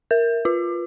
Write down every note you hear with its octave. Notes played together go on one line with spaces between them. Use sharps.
A#4
F4